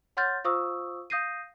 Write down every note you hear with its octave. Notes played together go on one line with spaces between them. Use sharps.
C#5 F#5 C6 F6 G6 A6
F4 C5 F5 C#6 D#6 E6
F5 D#6 G6 A#6 C7 D#7